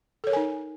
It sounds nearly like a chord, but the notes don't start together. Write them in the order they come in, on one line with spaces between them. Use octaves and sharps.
A4 C#5 A#4 G#5 D#4